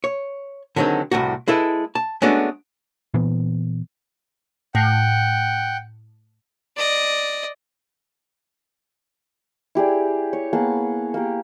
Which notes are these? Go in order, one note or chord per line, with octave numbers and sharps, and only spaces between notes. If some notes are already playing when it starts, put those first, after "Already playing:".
C#5
D3 D#3 F#3 G#3 C4
C2 F#2 A2 F#4
G#3 E4 A4 B4
A5
G#3 A3 B3 C#4 D4 F#4
A#2 E3 B3
A2 F#5 G5
D5 D#5
E4 G4 G#4 D5
C#5
A#3 B3 G#4 A5
A#3 G4